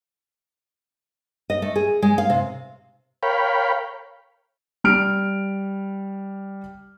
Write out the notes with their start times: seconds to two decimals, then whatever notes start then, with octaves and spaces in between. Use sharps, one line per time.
1.50 D#5
1.62 A3
1.76 G#4
2.02 G#3
2.18 F5
2.30 C3
3.23 A#4 C#5 F5 G5 B5
4.84 G3 F6 D7